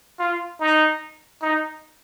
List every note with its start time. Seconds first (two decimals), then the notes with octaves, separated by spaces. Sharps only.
0.19 F4
0.60 D#4
1.42 D#4